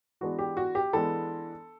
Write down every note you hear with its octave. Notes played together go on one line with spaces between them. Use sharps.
E3 G#3 B3 D4 F#4
G4
F#4
G4
E3 G#3 B3 D4 A4